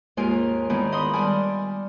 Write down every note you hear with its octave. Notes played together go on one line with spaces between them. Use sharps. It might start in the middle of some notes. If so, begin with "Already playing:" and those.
D#2 G#2 G#3 F4 A#4 G#5
D#3 G#3 B3 D4 E4
D#5 F#5 B5 C6 D#6
G3 D5 F#5 G#5 A5 F6